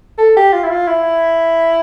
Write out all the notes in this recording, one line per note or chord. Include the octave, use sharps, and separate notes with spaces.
A4
G4
F4
E4
F4
E4